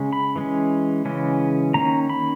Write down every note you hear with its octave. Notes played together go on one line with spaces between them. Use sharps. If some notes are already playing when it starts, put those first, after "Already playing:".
Already playing: C#3 G#3 C#4
B5
E3 G#3 C#4
C#3 E3 G#3 C#4
D#3 A#3 C#4 A#5
B5